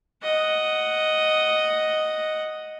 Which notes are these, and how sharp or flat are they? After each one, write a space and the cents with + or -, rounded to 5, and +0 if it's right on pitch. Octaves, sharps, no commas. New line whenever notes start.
D#5 +0 F#5 +0